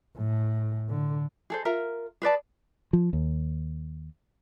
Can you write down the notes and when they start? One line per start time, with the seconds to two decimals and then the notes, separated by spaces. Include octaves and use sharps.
0.17 A2
0.89 D3
1.50 G#4 A4 C5
1.65 F4 A#4 E5 A#5
2.22 G#4 B4 D5 A5
2.93 F3
3.13 D#2